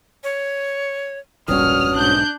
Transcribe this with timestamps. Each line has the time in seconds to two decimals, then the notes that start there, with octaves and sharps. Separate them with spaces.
0.23 C#5
1.48 E1 A#1 G2 C#4 F#4 D#6 F6
1.94 B1 G#2 D4 F#6 G6